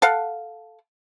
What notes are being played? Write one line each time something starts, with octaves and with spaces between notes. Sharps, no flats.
A4 F5 F#5